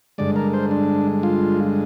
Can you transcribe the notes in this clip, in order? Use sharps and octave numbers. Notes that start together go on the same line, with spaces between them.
G2 D3 G#3 D5
A#4
C5
D4
F4